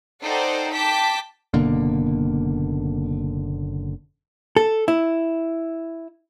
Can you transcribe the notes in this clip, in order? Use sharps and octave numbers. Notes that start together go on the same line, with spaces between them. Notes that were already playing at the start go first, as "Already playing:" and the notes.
D#4 A4 C5 D5 F#5 G5
G5 A5 D6 B6
F#1 B2 D3 A#3
A4
E4